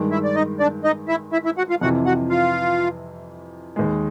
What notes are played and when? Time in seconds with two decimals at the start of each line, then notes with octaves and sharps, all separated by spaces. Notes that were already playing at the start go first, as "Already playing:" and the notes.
Already playing: G2 D#3 G#3
0.11 E4 E5
0.24 D5
0.35 D#4 D#5
0.60 D4 D5
0.84 D#4 D#5
1.08 E4 E5
1.33 E4 E5
1.45 E4 E5
1.58 F#4 F#5
1.70 F4 F5
1.81 F2 C3 E3 F#4 F#5
2.06 F#4 F#5
2.30 F4 F5
3.76 D#2 D#3 G#3